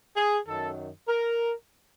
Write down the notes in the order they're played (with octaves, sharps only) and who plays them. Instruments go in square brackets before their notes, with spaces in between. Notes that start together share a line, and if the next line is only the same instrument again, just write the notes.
[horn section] G#4
F#2 D#3 F#3 A4
A#4